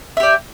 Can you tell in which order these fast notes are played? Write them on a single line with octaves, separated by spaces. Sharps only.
E5 G4 D5